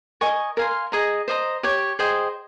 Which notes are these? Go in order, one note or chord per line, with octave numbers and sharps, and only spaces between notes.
A#4 D#5 G#5 C#6
A#4 F5 G#5 C6
G#4 D#5 A#5
C5 D#5 A#5
G4 C#5 G5
G#4 C5 D#5 G5